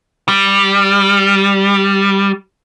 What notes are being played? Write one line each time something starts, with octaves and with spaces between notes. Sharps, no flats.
G3